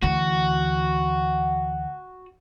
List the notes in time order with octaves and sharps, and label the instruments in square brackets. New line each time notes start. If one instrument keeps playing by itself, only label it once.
[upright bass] D2 E3 [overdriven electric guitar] F#4